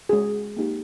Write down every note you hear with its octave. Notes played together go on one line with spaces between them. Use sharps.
G#3 C#4 F#4 G#4
A#3 D#4 G4